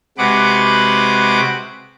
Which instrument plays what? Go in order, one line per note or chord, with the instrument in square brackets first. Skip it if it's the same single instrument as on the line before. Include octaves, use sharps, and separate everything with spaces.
[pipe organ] C3 G#3 F#4 B4 F#5 D6